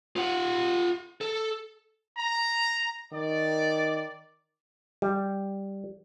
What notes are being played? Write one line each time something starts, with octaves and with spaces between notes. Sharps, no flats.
F4 F#5
A4
A#5
D#3 D5
G3